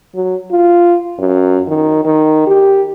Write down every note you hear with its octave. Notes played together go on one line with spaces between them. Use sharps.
F#3
F4
F#2
D#3
D#3
G4